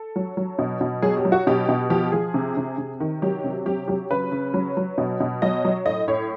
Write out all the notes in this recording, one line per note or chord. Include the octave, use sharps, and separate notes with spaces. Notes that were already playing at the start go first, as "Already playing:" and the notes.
Already playing: A4
F#3
F#3
B2
B2
F#3 G#4
G4
F#3
F#4
B2 G4
B2
F3 G4
F3 G#4
C3
C3
C3
D#3
F#3 G4
C3
F#3 G4
F#3 G4
C#3 B4
C#3
F#3
F#3
B2
B2
F#3 D#5
F#3
A2 D#5
A2 C#5